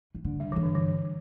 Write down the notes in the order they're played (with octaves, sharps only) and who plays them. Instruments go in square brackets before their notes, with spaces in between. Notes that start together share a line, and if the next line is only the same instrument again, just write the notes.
[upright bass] E3
D3
[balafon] G3
[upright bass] G2 [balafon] E3
[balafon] D3
E3